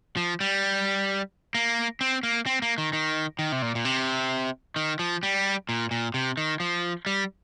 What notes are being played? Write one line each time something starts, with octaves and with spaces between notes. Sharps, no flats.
F3
G3
A#3
C4
A#3
C4
A#3
D#3
D#3
D#3
C3
A#2
A#2
C3
D#3
F3
G3
A#2
A#2
C3
D#3
F3
G3